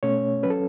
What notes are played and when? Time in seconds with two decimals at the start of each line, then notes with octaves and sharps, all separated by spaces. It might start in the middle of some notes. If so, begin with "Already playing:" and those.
0.03 B2 A3 C#4 C#5
0.43 F#3 C#4 B4
0.50 A4